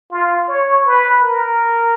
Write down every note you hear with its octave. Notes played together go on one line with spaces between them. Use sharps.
F4
C#5
B4
A#4